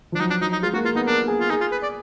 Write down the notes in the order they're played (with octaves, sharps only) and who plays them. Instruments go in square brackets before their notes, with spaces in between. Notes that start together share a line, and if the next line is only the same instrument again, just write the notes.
[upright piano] F3
[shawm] D4
[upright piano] F#3 [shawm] D#4
[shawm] D4
[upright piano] F#3 [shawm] D#4
[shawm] D#4
[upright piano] G#3 [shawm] F4
[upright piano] A#3 [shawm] F#4
[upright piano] G#3 [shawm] F4
[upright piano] B3 [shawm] D#4
[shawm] D4 [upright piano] A#4
[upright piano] G#4
[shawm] F4
[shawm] D#4 [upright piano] G#4
[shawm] F4
B4
D5